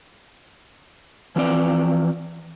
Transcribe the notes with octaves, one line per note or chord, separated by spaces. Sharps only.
E3 F3 C4 D5